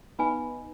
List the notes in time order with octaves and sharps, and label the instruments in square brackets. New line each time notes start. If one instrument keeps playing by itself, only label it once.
[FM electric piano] B3 D#4 [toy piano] B4 F5 G#5 B5